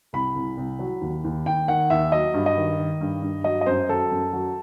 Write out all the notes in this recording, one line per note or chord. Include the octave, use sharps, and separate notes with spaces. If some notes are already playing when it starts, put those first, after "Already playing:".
C2 B5
C2
C2
F#3
D#2
D#2
D#2 G5
D#3 F#5
D#2 E5
F#3 D#5
G2
D#5
D#3
D#3
G2
G2
F#3 D#5
D#5
F#2 C5
F#3 A4
F#2
F#3